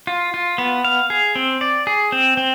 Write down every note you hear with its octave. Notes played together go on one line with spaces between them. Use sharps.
F4
F4
B3
F5
G#4
C4
D5
G#4
C4
C4